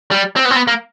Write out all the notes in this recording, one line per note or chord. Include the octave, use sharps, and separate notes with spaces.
G3
C4
B3
C4
B3
A#3